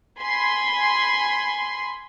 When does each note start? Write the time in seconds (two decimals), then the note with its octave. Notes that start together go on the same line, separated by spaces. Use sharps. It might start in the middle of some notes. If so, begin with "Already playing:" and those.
0.20 G#5 B5 C6 G#6